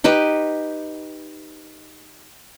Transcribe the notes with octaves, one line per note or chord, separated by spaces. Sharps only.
D#4 G4 B4